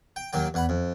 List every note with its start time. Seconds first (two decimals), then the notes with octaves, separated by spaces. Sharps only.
0.16 G5
0.33 D#2 D#3 F#3 G5
0.54 E2 F#5 B5
0.69 F2